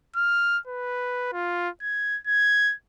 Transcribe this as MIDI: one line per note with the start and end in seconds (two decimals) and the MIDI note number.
0.16 0.58 89
0.67 1.32 71
1.33 1.69 65
1.82 2.18 92
2.27 2.74 92